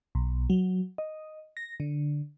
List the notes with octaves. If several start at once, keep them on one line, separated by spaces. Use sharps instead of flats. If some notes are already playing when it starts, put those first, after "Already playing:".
B1
F#3
D#5
A#6
D3